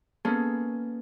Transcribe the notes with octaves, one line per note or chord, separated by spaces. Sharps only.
A#3 B3 C#4 G#4 A4